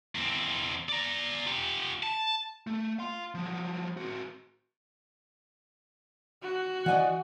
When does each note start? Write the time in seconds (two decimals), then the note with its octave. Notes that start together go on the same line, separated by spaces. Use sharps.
0.15 E2 C4
0.89 D5 A#5
1.46 F4 G4
2.03 A5
2.67 A3
2.99 F5 C6
3.35 F3 F#3
3.97 C4 F#4
6.42 F#4
6.86 E3 D5 D#5 F#5 G#5